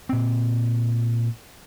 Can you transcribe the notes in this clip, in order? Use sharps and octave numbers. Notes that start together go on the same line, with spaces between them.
A#2 C4